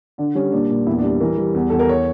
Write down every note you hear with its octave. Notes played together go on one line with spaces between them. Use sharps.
D3 D4
G3 C#4
A#2 D4
A#2
E2 E4
D4
G3
E3 A#4
G3
E2
E2 A4
A#4
C#5